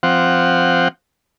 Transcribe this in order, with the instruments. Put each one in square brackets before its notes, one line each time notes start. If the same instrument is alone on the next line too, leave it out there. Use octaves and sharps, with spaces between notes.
[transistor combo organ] F3 C4 F#5